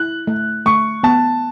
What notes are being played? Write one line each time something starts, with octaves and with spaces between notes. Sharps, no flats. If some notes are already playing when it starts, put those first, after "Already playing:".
Already playing: E4 F#6
A3
A3 C#6
B3 A5